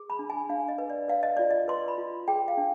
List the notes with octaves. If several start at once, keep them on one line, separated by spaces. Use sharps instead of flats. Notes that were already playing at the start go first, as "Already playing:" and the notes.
Already playing: G#4
B5
D4
G#5
D4 F5
D#5
B4
D5
B4 F5
D#5
F4 D5
D#5
B4 C6
B5
F4
G#4 G5
F5
D4